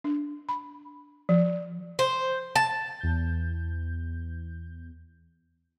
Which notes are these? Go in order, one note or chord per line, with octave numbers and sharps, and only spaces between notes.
D4
B5
F3
C5
A5
E2 G6